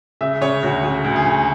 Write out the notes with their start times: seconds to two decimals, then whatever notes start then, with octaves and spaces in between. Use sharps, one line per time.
0.21 C#3 E5
0.41 C#3 C#5
0.63 D2 F#4
0.84 C#3
1.04 D2
1.16 G#4
1.25 D2